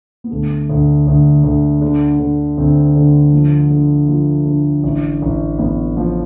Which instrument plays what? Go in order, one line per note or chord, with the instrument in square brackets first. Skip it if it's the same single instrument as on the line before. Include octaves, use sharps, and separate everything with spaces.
[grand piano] B3
D2 A3
D2
D2
D2
D3
D3
D2 C4
D3
F3
D3
F3 F4
D3
A1
A1
A1 B3
F3